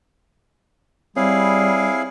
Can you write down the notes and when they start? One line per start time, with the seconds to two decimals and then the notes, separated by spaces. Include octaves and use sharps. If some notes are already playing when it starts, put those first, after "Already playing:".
1.16 G3 C4 E4 G#4 C#5 F5